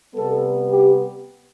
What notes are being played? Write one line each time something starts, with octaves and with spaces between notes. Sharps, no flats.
C3 G3 B3 A4
G4